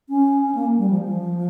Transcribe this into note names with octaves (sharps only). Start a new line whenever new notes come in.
C#4
A#3
G3
F3
F3